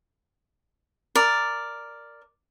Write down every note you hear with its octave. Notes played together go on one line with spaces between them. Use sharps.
A#4 D5